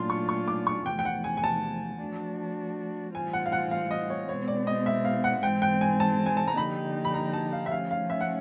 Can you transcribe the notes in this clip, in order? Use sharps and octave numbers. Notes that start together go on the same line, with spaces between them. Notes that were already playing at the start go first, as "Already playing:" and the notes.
Already playing: A#2 F#3 A3 D4 F4 C6
C#6
C#6
D6
C#6
E2 C3 F3 A3 G5
G5
F#5
G#5
G#5
A5
F3 A3 D4 F#4
A2 E3 G3 C4 F4 G#5
F#5
F5
F#5
F5
D#5
C#5
B2 G#3 C4 C#5
D5
D#5
E5
F5
F#5
G#2 E3 G#3 C4 G5
G5
G#5
A5
G#5
A5
A#5
D3 F3 A#3 D#4 G4 B5
B5
A#5
A5
F5
E5
F3 A3 C#4 F5
F5
E5
F#5